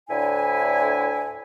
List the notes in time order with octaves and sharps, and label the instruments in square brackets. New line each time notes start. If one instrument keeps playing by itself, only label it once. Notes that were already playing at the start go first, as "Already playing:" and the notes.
[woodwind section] D2 A2 D3 E4 G#5